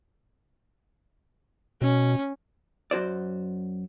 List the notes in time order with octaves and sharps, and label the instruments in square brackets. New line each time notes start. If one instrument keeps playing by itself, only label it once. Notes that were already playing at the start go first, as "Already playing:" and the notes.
[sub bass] B2 [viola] C#4
[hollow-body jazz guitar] F#2 F#4 C5 D5